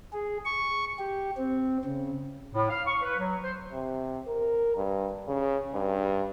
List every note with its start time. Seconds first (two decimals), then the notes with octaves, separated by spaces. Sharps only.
0.13 G#4
0.45 C#6
0.99 G4
1.37 C4
1.85 C#3
2.54 A2
2.70 F5
2.87 C#6
3.02 B4
3.18 F#3
3.44 C5
3.73 C3
4.27 A#4
4.77 G2
5.28 C#3
5.75 G2